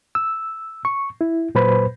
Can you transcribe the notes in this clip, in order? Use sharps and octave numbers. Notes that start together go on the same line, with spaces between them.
E6
C#6
E4
A#2 F#3 B4 C5 B5